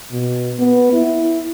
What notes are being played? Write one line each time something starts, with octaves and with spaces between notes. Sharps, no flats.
B2
B3
E4